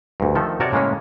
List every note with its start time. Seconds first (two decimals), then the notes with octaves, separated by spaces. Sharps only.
0.20 D2 G2
0.35 D#3 F3 A3 A4
0.60 C3 F#4 A#4 C#5 D5 A5
0.72 A2 C#3 G#3 A#3 C#4